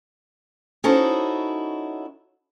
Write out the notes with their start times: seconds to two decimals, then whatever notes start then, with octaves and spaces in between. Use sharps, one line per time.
0.84 C#4 D#4 E4 F#4 A4 C5